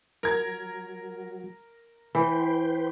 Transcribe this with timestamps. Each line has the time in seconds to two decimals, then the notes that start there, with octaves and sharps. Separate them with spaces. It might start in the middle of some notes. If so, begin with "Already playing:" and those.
0.23 F#3 A#4 G#6
2.15 E3 B4 C5 G5